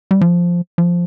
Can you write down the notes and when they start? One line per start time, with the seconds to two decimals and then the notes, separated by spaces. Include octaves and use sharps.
0.11 G3
0.21 F3
0.78 F3